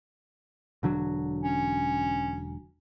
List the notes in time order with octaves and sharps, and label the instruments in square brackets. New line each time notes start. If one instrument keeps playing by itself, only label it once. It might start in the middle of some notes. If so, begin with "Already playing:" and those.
[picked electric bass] E1 D3 F#3
[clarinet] C#4